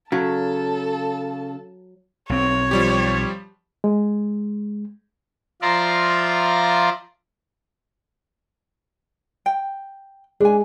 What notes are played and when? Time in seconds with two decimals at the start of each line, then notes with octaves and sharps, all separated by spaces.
0.12 C#3 F#3 A4 A5
2.29 B1 C4 C#5
2.71 F3 G3 G4
3.84 G#3
5.62 F3 F4 D5 E5 A#5 C6
9.46 G5
10.40 G#3 D4 G#5